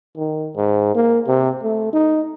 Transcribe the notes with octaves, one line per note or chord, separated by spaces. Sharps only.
D#3
G#2
A#3
C3
A3
D#4